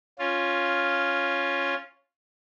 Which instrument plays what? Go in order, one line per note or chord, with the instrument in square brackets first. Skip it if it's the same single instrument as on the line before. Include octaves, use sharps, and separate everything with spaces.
[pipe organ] C#4 F4